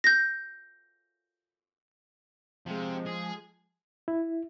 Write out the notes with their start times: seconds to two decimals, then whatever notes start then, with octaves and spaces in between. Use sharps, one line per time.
0.04 G6 A#6
2.66 C3 F3 G#3
3.06 G#4
4.08 E4